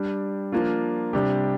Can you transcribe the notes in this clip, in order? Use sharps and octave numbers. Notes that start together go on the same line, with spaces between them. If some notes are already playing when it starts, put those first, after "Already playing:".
Already playing: G3 D4 G4
F3 A#3 D4 F4
C3 G3 D4 G4